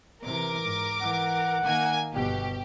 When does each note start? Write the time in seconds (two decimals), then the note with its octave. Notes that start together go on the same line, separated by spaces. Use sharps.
0.22 C3 E3 A#4 D6
0.62 G#2
1.02 E3 F#5
1.64 D#3 A#3 G#5
2.13 G1 B2 G4